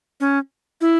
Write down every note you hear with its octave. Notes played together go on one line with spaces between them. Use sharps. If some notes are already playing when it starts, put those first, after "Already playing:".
C#4
E4